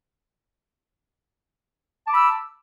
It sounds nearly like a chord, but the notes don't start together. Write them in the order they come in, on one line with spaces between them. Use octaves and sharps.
A5 D6 B5 E6